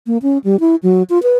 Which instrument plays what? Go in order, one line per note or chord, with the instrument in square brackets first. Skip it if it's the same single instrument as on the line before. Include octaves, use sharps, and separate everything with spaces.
[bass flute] A#3
C#4
G3
E4
F#3
F4
B4